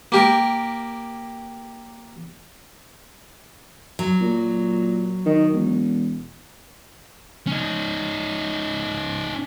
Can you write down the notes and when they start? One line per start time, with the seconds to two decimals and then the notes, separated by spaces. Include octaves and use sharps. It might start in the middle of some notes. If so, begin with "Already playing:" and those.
0.12 A#3 G4 A#4
3.99 F#3
4.21 A#2
5.26 D#3
5.53 E1
7.47 C#4 D#4